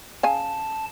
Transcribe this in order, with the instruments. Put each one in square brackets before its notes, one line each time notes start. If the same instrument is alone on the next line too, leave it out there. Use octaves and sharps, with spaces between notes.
[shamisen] C#3 F5 G#5 [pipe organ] A5